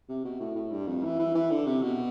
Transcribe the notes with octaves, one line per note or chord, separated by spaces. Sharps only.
C3
B2
A2
A2
G2
F2
E3
E3
E3
D3
C3
B2